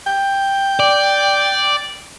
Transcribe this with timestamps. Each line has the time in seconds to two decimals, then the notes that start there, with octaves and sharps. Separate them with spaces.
0.06 G5
0.80 D5